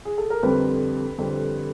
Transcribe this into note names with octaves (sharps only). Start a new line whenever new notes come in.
G#4
A4
A#4
F2 D3 G3 C4 B4
F2 D3 G3 C4